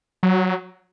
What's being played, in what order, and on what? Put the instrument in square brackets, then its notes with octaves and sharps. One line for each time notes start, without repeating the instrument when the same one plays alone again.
[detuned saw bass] F#3